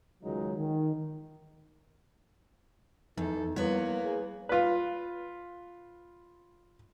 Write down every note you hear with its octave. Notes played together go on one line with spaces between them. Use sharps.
C#2 D#3 F#3 G#3 D#4
D#3
E2 F3 D#4 A4
G3 A#3 B3 E4 B4 C#5
G#4
F4 B4